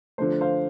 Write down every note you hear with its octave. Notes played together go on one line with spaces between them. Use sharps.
D3 F3 A3 C5
C5 F5